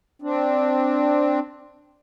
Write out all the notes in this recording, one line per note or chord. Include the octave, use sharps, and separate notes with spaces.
C4 D4